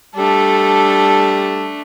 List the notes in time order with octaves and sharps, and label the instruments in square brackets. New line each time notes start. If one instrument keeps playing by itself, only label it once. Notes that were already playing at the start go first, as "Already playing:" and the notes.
[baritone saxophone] G3 [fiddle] A3 D4 [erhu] A4